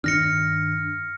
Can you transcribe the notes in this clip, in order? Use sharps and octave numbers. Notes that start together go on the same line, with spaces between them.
G2 D#3 D4 F6 A#6 C#7